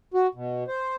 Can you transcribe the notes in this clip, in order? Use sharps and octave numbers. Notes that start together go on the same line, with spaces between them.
F#4
B2
C5